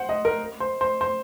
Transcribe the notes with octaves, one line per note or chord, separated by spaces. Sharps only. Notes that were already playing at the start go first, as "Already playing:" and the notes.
Already playing: C5 F#5
D#5
A#4
C5
C5
C5